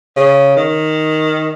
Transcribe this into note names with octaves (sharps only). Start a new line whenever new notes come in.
C#3
D#3